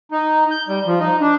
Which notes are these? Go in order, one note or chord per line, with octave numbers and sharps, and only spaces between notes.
D#4
G6
G3
F3
D#4
D4